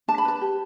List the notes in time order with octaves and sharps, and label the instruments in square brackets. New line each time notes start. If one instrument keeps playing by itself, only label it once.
[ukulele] D4 A5
B5
B4 A5
G4